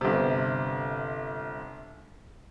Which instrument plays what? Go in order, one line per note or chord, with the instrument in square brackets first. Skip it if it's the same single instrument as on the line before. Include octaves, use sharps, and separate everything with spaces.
[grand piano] G1 C3